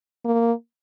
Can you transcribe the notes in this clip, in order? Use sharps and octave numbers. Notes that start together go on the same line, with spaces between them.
A#3